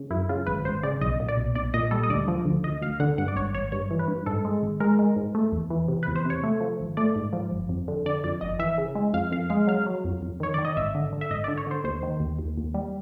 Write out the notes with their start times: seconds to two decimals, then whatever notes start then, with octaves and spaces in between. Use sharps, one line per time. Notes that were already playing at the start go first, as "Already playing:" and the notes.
Already playing: C#3
0.10 F#2 E4
0.29 C#3 F4
0.47 G#1 B4
0.65 G#1 C5
0.83 C#3 D5
1.01 B1 D#5
1.20 A#2
1.28 D5
1.37 B1
1.55 B1 D5
1.74 A#2 D#5
1.91 G3 A4
2.03 D#5
2.10 D2 D5
2.28 F3
2.45 D2
2.64 D2 D#5
2.82 D2 F5
3.00 D3 F#5
3.18 G2 F#5
3.28 D5
3.36 G#1 C#5
3.54 G#1 C#5
3.72 G2 C#5
3.91 E3
3.99 B4
4.08 G2
4.26 G#2 A4
4.45 G#3
4.62 G#1
4.80 G#3 A#4
4.99 G#3
5.16 G#2
5.35 A3
5.52 E2
5.70 E3
5.88 C3
6.03 B4
6.08 E2
6.16 C5
6.25 C3 C#5
6.44 A3
6.61 F3
6.80 G#1
6.97 A3 D5
7.15 G#2
7.33 F3
7.51 G1
7.69 F2
7.88 D3
8.06 D3 D5
8.24 F2 D5
8.41 G1 D#5
8.59 E3 E5
8.78 C#3
8.95 G#3
9.13 F2 F5
9.32 F2 F5
9.50 G#3 F5
9.67 F#3 F5
9.86 F#3
10.05 F2
10.22 F2
10.40 D#3 C#5
10.54 D#3 D5
10.65 D#5
10.77 G#1 E5
10.95 D3
11.13 D3
11.21 E5
11.31 G#1 D#5
11.44 D5
11.48 D3
11.58 C#5
11.67 D3 C5
11.84 D#2 C5
12.03 D#3
12.20 D#2
12.39 D#2
12.57 D#2
12.74 G3